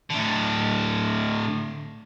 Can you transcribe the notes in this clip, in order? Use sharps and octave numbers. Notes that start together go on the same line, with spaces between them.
A2 D3